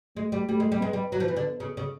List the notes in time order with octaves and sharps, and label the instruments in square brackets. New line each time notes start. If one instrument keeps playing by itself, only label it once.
[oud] G#3 [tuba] A3
[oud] G3
[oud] G3 [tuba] A3
[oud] G#3
G3
[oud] G#3 [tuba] B3
[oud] G3
F#3
F3
E3
D3
C#3
C#3